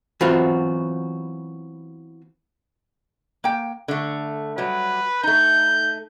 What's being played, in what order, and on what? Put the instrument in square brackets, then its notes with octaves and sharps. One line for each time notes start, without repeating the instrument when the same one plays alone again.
[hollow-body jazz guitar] E3 F#3 B3 C4 F4 F#4
[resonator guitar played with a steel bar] A#3 G5
D3 A3
[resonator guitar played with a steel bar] F#3 G3 [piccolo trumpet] B4
[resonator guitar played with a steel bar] A3 D#4 [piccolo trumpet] G6